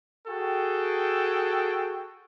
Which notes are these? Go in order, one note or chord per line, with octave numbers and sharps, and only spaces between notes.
F#4 G#4 A4 G5